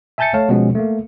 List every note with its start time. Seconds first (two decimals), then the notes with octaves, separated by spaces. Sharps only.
0.18 E5 G#5 A5 G6 A6 C#7
0.34 A3 C#5 F5 A5
0.49 B2 F3 G#3 B3 C#4
0.75 A3 A#3